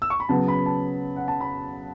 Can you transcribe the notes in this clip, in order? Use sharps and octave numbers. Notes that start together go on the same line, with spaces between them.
E6
C#6
B5
C#3 F#3 B3 A5
B5
A5
F#5
A5
B5